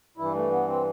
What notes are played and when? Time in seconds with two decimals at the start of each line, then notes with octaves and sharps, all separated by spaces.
0.17 G2 E3 E4
0.34 A3
0.51 B3
0.68 C4